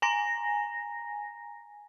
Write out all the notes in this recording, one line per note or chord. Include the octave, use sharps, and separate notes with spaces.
G#5 A#5 A#6